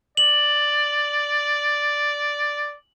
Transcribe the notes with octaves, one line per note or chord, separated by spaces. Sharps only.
D5 F#7